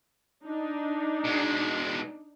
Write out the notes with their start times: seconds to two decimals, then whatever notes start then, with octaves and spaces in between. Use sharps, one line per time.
0.46 D4 D#4
1.24 B2 G#3